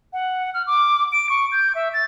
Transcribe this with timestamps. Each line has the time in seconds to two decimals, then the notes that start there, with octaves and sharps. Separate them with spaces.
0.13 F#5
0.54 F6
0.67 D6
1.12 D7
1.30 C#6
1.52 G6
1.75 E5
1.93 A6